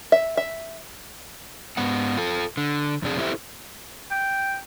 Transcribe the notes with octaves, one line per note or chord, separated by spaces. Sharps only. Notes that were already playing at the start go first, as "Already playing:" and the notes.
E5
E5
G#2 B3 F#5
F4 A4
D3
F2 C3 D4 G#4
E4 G4 A4 C5 E5
G5